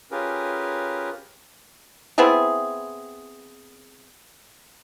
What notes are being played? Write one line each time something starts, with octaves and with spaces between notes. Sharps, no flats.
C#4 F4 G4 G#4 A#4 B4
B3 C4 E4 G#4